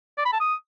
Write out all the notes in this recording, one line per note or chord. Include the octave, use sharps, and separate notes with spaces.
D5
B5
A5
D#6